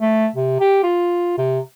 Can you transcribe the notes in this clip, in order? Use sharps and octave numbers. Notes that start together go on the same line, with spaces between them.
A3
C3
G4
F4
C3